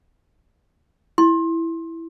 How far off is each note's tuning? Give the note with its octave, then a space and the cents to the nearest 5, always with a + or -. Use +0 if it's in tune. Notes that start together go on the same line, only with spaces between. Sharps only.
E4 +0 C6 +25